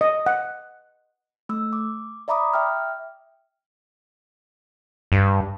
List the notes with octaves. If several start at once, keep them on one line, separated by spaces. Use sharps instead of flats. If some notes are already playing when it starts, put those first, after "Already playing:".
D#5
F#5
A3 E6
D6
D5 E5 A#5 B5 D6 D#6
E5 G5 F6
G2